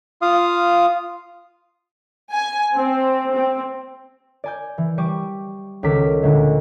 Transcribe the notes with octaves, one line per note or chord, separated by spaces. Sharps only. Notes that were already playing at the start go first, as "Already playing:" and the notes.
F4 F5 D#6
G#5
C4
C4
D5 G#5 G6
E3
G3 C#6 D6 D#7
C#2 D#3 A4 D6 B6
D2 A#2 D3 G#3